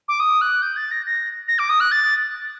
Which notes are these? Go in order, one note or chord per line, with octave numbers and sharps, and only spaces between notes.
D6
D#6
F#6
G6
A6
A#6
A#6
A#6
D6
D#6
F#6
A6